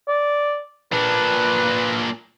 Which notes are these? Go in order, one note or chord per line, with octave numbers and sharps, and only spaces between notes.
D5
A#2 D4 B4